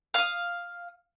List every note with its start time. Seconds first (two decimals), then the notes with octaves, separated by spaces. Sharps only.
0.14 F5 D#6